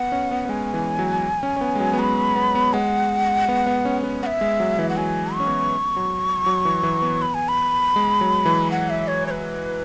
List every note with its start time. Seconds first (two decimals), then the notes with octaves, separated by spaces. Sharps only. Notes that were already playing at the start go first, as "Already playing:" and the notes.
Already playing: B3 F#5
0.12 C#4
0.31 B3
0.45 B3
0.49 G#3 G#5
0.74 E3
0.99 F#3
1.43 C#4
1.56 C#4
1.61 B3
1.75 G#3
1.80 F#3
1.93 B3
1.99 G#3 B5
2.36 B3
2.55 B3
2.73 G#3 F#5
3.49 B3
3.66 B3
3.85 C#4
4.04 B3
4.23 B3 F#5
4.26 E5
4.41 G#3
4.60 F#3
4.79 E3
4.89 F#5
4.97 F#3 G#5
5.35 C#6
5.40 C#4
5.47 B3
5.96 F#3
6.46 F#3
6.65 E3
6.83 E3
7.02 B3
7.22 B5
7.34 G#5
7.48 B5
7.96 G#3
8.21 F#3
8.46 E3
8.71 F#5
8.90 E5
9.08 C#5
9.27 C#5
9.31 B4